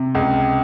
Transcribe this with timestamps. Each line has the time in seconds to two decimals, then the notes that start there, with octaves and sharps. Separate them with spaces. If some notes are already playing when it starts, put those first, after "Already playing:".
Already playing: C3
0.15 C#2